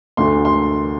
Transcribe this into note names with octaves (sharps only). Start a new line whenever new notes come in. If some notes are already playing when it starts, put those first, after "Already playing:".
D2 D3 A3 C6
C6